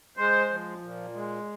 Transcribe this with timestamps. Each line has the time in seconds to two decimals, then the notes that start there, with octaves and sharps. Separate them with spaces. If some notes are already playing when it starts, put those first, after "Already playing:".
0.17 G#3 C5
0.50 F3
0.82 A#2
1.14 G#3